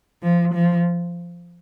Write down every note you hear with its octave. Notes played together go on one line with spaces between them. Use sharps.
F3
F3